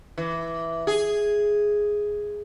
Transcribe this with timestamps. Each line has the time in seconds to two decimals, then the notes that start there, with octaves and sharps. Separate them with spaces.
0.18 E3
0.87 G#4